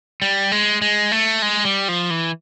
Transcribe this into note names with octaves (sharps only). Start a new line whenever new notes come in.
G3
G#3
G#3
A3
G#3
G3
F3
E3